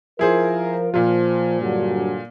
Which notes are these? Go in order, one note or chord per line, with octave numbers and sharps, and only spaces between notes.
F3 E4 F4 G#4 A#4 C5
A#2 F3 F4
G2 D3 F#3